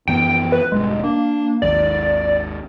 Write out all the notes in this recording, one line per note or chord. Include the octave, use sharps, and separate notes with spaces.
F#2 E3 B3 G5
B4
E1 G2 G#3
A#3 D4
G#1 D#2 G#2 D5